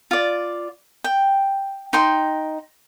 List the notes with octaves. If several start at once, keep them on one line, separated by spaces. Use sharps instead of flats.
F4 D5
G5
D#4 G5 C6